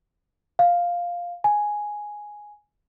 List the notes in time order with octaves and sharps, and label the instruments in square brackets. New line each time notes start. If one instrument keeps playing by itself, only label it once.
[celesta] F5
G#5